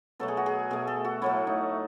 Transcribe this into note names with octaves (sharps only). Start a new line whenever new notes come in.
B2 F#3 A3 A4
G#4
F#4
G#4
B2 A3 G#4
A4
F#4
A2 F#3 A3 E4
D#4